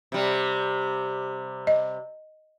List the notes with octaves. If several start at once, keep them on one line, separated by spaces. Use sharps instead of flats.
C3 G3
D#5